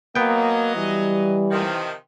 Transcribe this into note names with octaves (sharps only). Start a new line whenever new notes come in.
F#3 A#3 B3 D#5 G5
E3 G3
C3 D#3 F3